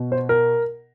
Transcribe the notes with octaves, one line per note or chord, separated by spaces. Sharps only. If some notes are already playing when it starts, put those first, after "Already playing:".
Already playing: B2
C5
A#4